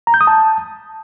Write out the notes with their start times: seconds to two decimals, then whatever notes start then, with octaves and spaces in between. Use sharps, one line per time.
0.07 A#5
0.14 G6
0.21 D#6
0.27 A5